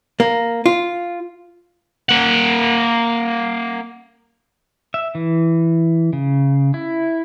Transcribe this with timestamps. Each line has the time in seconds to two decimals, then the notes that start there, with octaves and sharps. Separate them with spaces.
0.20 A#3
0.66 F4
2.09 A#3 F#5
4.94 E5
5.15 E3
6.13 C#3
6.74 E4